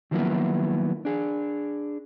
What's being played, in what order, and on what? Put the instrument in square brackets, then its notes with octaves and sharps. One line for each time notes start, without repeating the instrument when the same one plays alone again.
[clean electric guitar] D#3 F3 F#3 A#3 B3 E4
D4 G#4